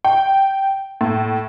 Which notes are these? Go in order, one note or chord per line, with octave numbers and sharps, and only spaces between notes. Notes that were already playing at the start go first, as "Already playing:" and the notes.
G5
A2